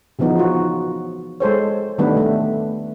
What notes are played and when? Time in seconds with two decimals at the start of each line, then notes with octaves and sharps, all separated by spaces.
0.19 C#3 E3 F3 B3 D#4
0.37 F4 F#4
1.40 G#3 A4 C5 C#5
1.98 D#3 G3 A3 B3 D4 B4
2.17 A3